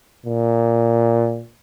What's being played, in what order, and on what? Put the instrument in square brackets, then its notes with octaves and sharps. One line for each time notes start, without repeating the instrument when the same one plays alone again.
[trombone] A#2